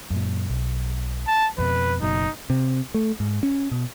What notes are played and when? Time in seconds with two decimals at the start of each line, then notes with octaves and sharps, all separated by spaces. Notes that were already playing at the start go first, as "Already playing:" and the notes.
0.10 F#2 A#2
0.49 B1
1.27 A5
1.58 F2 B2 B4
2.02 F#1 F#2 B2 D#4
2.50 C3
2.94 A3
3.20 G#2
3.43 C#4
3.71 B2